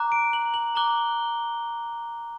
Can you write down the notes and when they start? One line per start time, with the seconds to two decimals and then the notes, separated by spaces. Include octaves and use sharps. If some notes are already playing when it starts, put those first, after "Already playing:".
Already playing: A#5 D6 F#6
0.12 D7
0.33 F#7
0.54 F#7
0.75 A#5 D6 F#6 G7